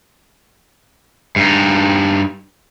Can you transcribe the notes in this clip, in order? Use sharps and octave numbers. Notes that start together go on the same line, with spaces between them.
G2 D#4